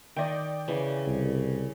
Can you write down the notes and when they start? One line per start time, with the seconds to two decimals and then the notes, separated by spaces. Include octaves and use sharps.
0.16 D#3 D5 D#5 G5
0.68 C#3 E3
1.07 C2